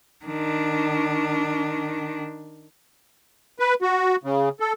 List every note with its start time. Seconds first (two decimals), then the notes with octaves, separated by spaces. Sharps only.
0.25 D#3 D4
3.59 B4
3.82 F#4
4.23 C#3
4.60 A4